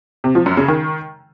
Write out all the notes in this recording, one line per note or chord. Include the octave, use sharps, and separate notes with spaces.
C3
F3
F#2
C#3
D#3